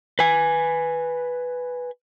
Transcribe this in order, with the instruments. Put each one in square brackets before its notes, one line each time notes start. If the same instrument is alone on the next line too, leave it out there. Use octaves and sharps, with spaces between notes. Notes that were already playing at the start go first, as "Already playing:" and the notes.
[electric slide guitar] B4 G#5